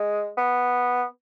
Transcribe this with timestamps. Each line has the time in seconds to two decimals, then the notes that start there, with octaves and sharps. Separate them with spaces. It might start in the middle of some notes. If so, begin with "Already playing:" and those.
Already playing: G#3
0.37 B3